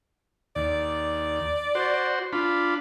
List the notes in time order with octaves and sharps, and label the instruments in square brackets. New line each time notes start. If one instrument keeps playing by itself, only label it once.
[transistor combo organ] D#2 [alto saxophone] D5
[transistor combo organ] F#4 C5
D4 F4 B5